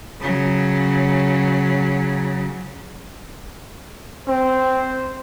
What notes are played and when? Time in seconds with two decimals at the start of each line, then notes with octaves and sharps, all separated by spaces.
0.21 C#3 F#3
4.28 C4 C5